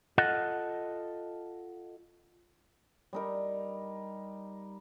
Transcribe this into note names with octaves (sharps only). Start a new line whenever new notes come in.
F4 A4 D#5 F#5
G3 D#4 A#4